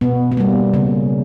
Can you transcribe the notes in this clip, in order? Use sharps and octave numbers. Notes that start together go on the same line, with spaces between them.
B2 B3
B3
G3 A#3
C#3